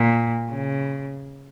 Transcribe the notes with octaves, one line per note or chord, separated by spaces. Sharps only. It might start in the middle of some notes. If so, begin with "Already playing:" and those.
Already playing: A#2
C#3